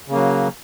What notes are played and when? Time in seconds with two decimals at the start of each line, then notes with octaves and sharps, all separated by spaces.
0.08 C#3
0.12 A#3
0.15 F#3